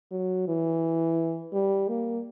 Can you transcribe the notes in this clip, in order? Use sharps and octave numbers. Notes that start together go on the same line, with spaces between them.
F#3
E3
G3
A#3